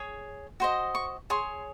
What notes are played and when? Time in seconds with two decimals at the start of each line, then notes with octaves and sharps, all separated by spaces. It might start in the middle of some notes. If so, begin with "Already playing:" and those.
Already playing: G#4 C#5
0.60 F#4 C5 D#5
0.95 C#6
1.30 G#4 C#5 C6